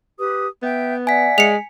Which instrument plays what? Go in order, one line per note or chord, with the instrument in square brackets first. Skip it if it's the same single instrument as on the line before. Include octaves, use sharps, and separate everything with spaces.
[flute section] G4 B4 D#6
[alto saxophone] B3 [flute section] E5 G5 G6
[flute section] D5 E5 F#5 [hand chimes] G#5 B6
[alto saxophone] G#3 [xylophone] C#7 F7